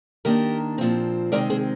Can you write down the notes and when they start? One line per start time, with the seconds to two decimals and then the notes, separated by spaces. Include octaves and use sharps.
0.25 D#3 A#3 D4 G4 A#4
0.78 A#2 F3 C4
1.32 C3 D#3 G#3 C4 A#4 D5
1.50 G#4 C5